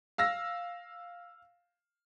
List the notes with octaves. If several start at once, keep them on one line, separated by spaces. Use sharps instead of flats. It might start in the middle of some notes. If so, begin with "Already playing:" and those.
F5 E6 A#6